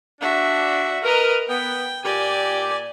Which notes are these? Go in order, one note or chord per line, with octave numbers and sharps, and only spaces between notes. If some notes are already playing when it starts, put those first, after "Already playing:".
D4 F#4 E5
A#4 B4 D#5
B3 G5
A#2 G4 D5 G#5